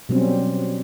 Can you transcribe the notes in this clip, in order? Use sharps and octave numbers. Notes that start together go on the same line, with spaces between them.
B2 F#3 G3 C4 C#4